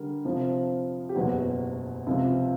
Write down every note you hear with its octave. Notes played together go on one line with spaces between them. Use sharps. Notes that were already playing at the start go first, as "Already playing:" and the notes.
Already playing: D3 G3 A#4
F2 C3 F3
G4
F#1 E2 B2 F#3 F#4
C#2 C3 F3